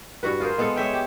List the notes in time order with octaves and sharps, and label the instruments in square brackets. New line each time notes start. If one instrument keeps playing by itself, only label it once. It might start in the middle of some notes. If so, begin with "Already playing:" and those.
[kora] G2 F#4 B4
F4 G#4 A#4 C5
G#3 B3 A4
G#3 C#5 E5 G5
G4